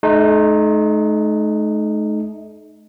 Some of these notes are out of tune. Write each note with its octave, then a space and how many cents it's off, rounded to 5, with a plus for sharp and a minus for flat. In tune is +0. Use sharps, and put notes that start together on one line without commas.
A3 -45 D#4 -15